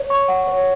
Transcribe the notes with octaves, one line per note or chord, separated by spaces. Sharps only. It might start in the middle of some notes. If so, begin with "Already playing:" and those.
Already playing: C#5
C#6
F#5
C#5